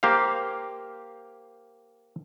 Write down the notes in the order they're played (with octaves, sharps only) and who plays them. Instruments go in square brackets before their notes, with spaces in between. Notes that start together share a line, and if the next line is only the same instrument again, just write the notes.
[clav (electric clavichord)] A#3 G4 C5 F5